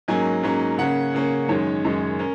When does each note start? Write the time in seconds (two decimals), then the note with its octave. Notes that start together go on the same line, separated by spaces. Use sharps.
0.08 G#2 F#3 A#3 C#4 G#5
0.43 G#2 F#3 A#3 C#4
0.78 C#3 A#3 C#4 F#5
1.14 C#3 A#3 C#4
1.49 F#2 D#3 G#3 C#4 C#5
1.85 F#2 D#3 G#3 C#4
2.19 C#4 A#4